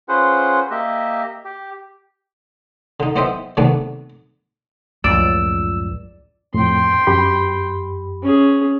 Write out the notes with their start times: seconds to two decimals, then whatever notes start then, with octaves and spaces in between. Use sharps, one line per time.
0.09 C#4 F4 G#4 B4 C5 F#5
0.71 A#3 G4 D#5 E5
1.45 G4
3.00 D3 D#4
3.16 B3 E4 C5 D#5 E5 G5
3.57 C3 D#3 A3 B3 D4
5.04 C#2 F#2 A2 F3 D5 E6
6.54 F2 A2 G5 C6
7.07 F#2 G4 B5
8.22 C#4 G#4